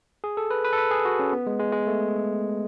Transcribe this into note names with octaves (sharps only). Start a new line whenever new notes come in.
G#4
A4
B4
B4
A4
B4
G#4
F#4
C#4
B3
G#3
G#3
G#3
A3